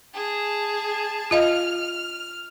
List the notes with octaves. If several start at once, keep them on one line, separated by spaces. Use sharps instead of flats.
G#4 A5
F4 D#5 F5 F6